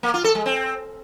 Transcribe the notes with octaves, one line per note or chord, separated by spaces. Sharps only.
A#3
F4
A4
G#3
C4